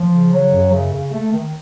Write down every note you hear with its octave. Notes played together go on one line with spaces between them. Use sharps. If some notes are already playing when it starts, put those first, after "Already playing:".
Already playing: F3
C#3
F#3
F#2
C#3
C#3
A3
D#3